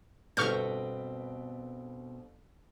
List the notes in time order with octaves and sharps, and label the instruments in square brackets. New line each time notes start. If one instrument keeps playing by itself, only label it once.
[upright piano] G1 A4 B4 [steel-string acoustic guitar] B2 C4 [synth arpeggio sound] C#6 F6 G6